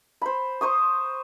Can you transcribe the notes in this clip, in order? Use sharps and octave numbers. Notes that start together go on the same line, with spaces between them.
C5 B5
C5 C#6 D#6